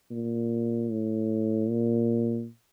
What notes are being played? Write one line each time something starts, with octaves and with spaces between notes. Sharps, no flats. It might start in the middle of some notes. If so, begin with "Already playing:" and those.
A#2
A2
A#2